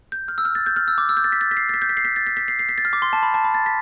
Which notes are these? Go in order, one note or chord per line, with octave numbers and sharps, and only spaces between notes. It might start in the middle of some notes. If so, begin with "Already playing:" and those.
G6
F6
E6
F6
A6
G6
F6
E6
D6
E6
G6
A6
B6
A6
B6
C7
A6
B6
G6
B6
C7
B6
A6
B6
B6
C7
C7
B6
A6
F6
D6
C6
A5
B5
A5
B5
A6
B6